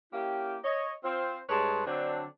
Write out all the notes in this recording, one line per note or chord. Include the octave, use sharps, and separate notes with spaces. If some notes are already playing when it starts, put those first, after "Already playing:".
A#3 C#4 E4 G4
C#5 D#5
C4 F4 C5
G2 G#3 B4 C#5 A5 C6
D3 F#3 C4 D4